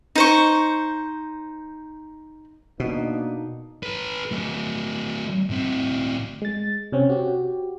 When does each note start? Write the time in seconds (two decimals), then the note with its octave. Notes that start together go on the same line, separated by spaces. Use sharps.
0.15 D#4 C5 C#6
2.80 B2 A#3 D4 D#4
3.83 A4 B4
4.32 F#3 A3
5.50 A2 C4
6.42 G#3 A6
6.92 C3 C4 C#4
7.10 F#4 G4